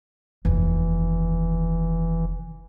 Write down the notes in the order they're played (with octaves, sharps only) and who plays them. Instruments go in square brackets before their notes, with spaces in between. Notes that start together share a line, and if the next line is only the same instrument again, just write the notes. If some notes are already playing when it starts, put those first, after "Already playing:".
[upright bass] F1 D#2 [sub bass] E3